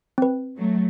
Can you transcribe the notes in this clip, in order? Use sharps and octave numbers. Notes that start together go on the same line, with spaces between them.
C4 B4
F#3 A3